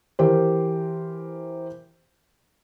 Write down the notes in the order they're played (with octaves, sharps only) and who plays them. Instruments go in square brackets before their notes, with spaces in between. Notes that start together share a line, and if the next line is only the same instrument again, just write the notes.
[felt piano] E3 G4 A#4 C5